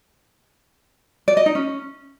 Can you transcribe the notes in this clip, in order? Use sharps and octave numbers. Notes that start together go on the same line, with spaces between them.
D5
D#5
D#4
C#4